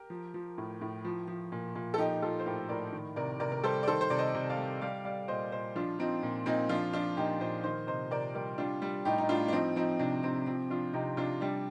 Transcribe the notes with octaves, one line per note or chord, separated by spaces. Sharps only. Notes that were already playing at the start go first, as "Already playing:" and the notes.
Already playing: G4 A#4
F3
F3
A2
A2
F3
F3
A#2
A#2
A4
F3 D#4 G4
F3 F4 A4
C5
A2 G4 A#4
A2 A#4 D5
D#3
C3 A#4 D5
C3 A#4 D5
A#4
G3 A4 C5
D5
D#3 A4 C5
C5
C3 D5
C5 D#5
C3
D5 F5
G3
G3 D5 F5
G3 D5 F5
A#2 C5 D#5
A#2 C5 D#5
F3 D4 F4
F3 C4 D#4
A#2
A#2 C4 D#4
F3 D4 F4
F3 D4 F4
A#2 D#4 G4
A#2 C5 D#5
D#3 C5 D#5
C3 C5 D#5
C3 A#4 D5
G3 A#4 D5
G3 D4 F4
G3
A2 D#4 G4
D#4
A2 D4 F4
D4
F3 C4 D#4
F3 C4 D#4
C3 D4
C3 C4 D#4
F3 C4
F3 D4 F4
C3 D#4 G4
C3 D4 F4
G3 D4